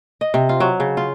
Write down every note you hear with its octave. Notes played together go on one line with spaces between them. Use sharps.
D#5
C3
F4
F#3
C#3
F4